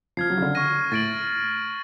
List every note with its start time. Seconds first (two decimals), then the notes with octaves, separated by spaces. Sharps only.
0.17 F3 F6 G#6 C7
0.30 F#3
0.38 C#3
0.42 D3
0.55 C#6 F6 A#6 D#7
0.92 A2 A6 D7 F#7